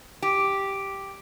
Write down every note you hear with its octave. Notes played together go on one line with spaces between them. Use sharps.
G4